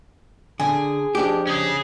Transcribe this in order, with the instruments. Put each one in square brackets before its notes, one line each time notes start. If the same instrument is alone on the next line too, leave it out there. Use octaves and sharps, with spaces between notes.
[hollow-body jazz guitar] D3 [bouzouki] G#4
[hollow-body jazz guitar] F2 D4 G4
[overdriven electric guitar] C#4 G#4